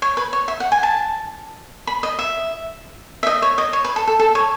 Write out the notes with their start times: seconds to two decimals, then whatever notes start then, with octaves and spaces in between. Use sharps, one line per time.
0.02 C#5
0.17 B4
0.33 C#5
0.48 E5
0.60 F#5
0.72 G#5
0.83 A5
1.87 B5
2.03 D#5
2.19 E5
3.23 E5
3.27 D#5
3.42 C#5
3.58 D#5
3.73 C#5
3.84 B4
3.96 A4
4.07 A4
4.19 A4
4.35 C#5